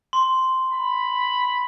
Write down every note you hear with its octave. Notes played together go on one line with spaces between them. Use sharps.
C6
B5